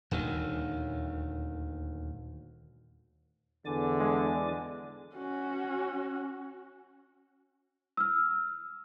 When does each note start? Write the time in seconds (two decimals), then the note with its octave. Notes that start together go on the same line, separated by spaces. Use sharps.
0.11 D#1 D2 D#3
3.66 E2 D3 D5 G#5 D6
4.00 G#3
5.16 C#4 F#4
7.97 E6 F6